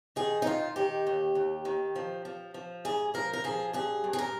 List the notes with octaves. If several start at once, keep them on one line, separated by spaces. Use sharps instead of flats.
D#3 G#4
D#4
D#3 F4
D#3 G4
D#2
D#2
D#3
F3
F3
F3
G#2 G#4
F3 A#4
A#4
F3 G#4
G2 G#4
G2
G#4
A#4